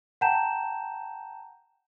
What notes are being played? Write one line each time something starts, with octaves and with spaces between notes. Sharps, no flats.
F#5 G5 A5 A#5 G6 E7